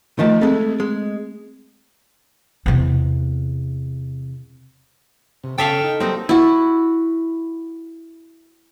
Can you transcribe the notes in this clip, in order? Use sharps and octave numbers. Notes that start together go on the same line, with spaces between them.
D#3 F3 A3 D#5 A5
G#3 A3 C4
G#3
E2 C3
C3
C#3 A4 E5 F5 G5
D#4
F#3 G3 A#3 C4 D#4
E4 F#4